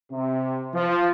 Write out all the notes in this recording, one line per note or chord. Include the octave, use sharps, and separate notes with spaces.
C3
F3